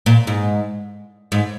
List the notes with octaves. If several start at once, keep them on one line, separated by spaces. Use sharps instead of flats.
A#2
G#2
G#2